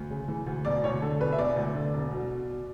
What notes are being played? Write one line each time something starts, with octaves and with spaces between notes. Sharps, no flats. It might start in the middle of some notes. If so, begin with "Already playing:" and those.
Already playing: D2
C#3
E3
D2
E1 D5
D2 C#5
D3 A4
E1 B4
E5
E1 D5
D2
D3
E1
B2
B2